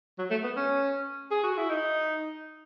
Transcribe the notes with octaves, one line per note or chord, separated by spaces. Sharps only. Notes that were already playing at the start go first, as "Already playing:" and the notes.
F#3
A3
B3
C#4
G#4
F#4
E4
D#4